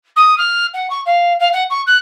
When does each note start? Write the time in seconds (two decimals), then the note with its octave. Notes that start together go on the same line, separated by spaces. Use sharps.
0.16 D#6
0.37 F6
0.73 F#5
0.90 C#6
1.05 F5
1.39 F5
1.53 F#5
1.70 C#6
1.86 F#6